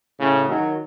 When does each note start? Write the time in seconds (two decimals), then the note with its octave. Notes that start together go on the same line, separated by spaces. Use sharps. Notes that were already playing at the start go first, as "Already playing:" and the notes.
0.19 A2 C#3
0.48 D#3 F#3